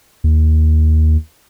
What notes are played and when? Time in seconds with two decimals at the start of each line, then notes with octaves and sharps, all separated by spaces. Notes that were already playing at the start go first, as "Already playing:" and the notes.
0.24 D#2